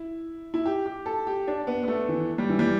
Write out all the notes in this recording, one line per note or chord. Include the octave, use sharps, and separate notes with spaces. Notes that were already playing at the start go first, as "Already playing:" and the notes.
Already playing: E4
E4
G4
G4
A4
G4
D4
B3
B3
A3
E3
G3
E3
G3